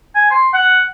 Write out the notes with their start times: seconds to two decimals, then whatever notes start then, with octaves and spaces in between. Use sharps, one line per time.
0.15 G#5
0.31 C6
0.54 F#5